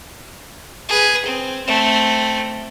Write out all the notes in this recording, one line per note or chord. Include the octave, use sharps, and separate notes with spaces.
G#4 B4
C4
A3 C4